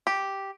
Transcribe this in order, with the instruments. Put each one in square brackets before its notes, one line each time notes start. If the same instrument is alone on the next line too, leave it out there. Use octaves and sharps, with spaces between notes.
[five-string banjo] G4